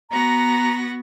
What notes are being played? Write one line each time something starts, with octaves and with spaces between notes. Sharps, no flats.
B3 F#4 A#5 A#6